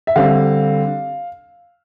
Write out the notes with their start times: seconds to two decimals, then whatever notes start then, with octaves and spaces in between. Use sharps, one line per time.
0.07 E5
0.16 D3 G3 C4 F5